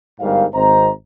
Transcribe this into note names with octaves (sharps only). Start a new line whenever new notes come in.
G1 G#2 G3 A#4 F5
G#1 C4 C5 D#5 A#5